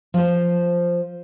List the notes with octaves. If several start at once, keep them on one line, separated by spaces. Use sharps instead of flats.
F3 C5